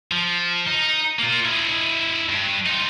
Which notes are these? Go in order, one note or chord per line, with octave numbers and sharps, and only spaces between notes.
F3
D#4
A#3 F4
E4 D#5
G2
D#4 F4